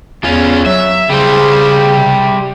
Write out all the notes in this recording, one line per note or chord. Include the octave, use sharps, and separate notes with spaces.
E2 C#4 F4
F#3 E5
C#3 G3 C5
C3